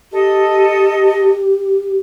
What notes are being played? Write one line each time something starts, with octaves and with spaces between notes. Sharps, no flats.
G4 A4 D#5